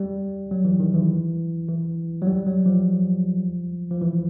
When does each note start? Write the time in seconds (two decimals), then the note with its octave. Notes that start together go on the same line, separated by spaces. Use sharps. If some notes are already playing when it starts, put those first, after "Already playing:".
Already playing: G3
0.51 F#3
0.65 E3
0.80 D#3
0.94 E3
1.68 E3
2.22 F#3
2.27 G3
2.46 F#3
2.66 F3
3.91 F3
4.01 E3